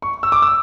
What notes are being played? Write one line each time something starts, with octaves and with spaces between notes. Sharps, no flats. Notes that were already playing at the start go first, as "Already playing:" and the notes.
C#6
E6
D6
E6